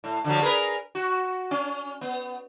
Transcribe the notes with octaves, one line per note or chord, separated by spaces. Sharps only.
A2
D3 F3 F#3
G#4 A#4 B4
F#4
C#4
B3